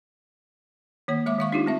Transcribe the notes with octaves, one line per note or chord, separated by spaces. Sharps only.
D#3 A#3 C#5
G#3 E5 D6
D#3 F5 C#6
D4 D#4 F4 G4
A3 C4 E5